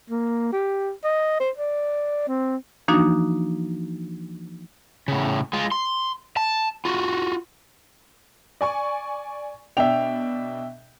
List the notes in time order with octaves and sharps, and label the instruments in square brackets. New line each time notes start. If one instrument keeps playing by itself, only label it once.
[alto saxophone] A#3
G4
D#5
C5
D5
C4
[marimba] E3 F3 A#3 D4 D#4 F#4
[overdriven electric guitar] A2 C#3
G#3 F4
C6
A5
F4 F#4
[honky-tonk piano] D5 G#5 C#6
[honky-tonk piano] B2 D4 F7 [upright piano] E5 G5